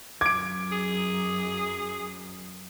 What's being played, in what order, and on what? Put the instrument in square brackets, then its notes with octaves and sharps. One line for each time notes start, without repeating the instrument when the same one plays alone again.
[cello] F#2 F#3 [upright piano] D6 [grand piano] G#6 D7
[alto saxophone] G#4